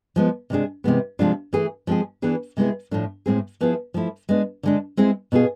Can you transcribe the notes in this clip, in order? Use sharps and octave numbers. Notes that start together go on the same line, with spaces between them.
F3 G#3 B3
C3 G#3 D4 G#4
C3 E3 G#3 B3
C3 F3 G#3 D4 F4
E3 A3 E4 G#4
F3 G#3 C4 G#4
E3 B3 D4 G#4
C3 G#3 B3 E4 G#4
A2 F3 A3 D4
A2 G#3 C4 G#4
F3 B3 E4 G#4
F3 A3 E4
G#3 B3 D4
D3 G#3 D4
G#3 C4 E4 G#4
B2 B3 F4 G#4